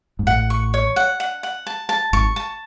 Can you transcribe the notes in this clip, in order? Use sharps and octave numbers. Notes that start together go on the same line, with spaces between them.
G#2
A1 A2 F#5
C#6
C#5
F#5
F#5
F#5
A5
A5
G#1 G#2 C#6
A5